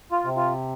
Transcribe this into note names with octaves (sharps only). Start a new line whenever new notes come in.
F4
C3
F4